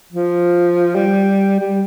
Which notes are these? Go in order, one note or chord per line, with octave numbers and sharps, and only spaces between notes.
F3
G3
G3